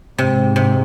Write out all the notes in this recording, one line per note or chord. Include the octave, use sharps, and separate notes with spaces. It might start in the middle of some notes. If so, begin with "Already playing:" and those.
G#2 C3
C3